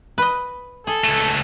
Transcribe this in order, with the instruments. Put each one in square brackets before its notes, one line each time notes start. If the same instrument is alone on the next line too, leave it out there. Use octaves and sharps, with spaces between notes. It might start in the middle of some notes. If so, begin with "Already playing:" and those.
[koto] B4 D#5
[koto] G#4 [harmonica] A4
[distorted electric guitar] C#2 A3